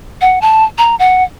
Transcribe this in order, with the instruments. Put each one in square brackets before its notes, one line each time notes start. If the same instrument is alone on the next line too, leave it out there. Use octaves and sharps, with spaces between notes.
[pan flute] F#5
A5
A#5
F#5